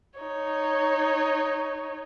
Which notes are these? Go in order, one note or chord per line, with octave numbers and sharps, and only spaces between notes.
D#4 C#5